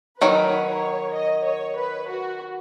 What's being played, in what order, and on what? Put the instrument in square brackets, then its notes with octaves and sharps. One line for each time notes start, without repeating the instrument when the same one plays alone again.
[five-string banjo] D#3 F#3 [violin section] B4
[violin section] C#5
D#5
C#5
B4
F#4